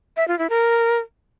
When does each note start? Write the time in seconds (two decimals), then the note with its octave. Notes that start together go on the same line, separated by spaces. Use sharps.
0.17 E5
0.28 F4
0.39 E4
0.50 A#4